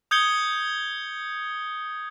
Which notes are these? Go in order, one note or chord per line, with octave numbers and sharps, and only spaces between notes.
D#6 G6 G#6 C#7 G7